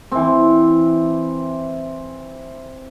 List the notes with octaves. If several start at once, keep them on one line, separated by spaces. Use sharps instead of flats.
E3 C4